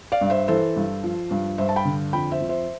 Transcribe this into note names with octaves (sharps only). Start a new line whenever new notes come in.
D5 F5
G2
C5 E5
E3 A4 C5
G2
F3
G2
G2 C5 E5
A5
G5 B5
D3
F2 G5 B5
C5 E5
F2
C5 E5